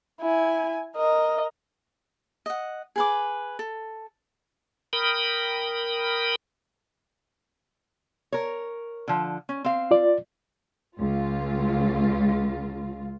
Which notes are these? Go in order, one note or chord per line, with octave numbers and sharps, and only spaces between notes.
E4 G#5
A#4 D#5
D#5 F#5
G#4 B4 D6
A4
A#4 G5 B5 D#6
A#4 C#5
D3 F3
C#4
C4 F5
F4 D5
C#2 F4